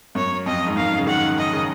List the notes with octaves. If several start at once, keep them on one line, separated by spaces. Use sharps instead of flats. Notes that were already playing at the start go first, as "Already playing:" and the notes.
F#2 C#5
F2 D#5
G#2
F#2 F5
C#3
D#3 F#5
D#5
C#3